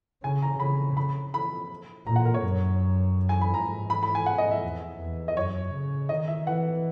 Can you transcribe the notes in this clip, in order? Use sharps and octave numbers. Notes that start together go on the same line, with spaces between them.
C#3 G#5
A#5
C#3 B5
B5
B5
A#2 A#5
F#5
A#4
C#5
F#2
G#5
B5
G#2 A#5
B5
B5
G#5
G#2 F#5
D#5
E5
E2
E2
D#5
F#2 C#5
C#3
D#3 D#5
E5
E3 F#5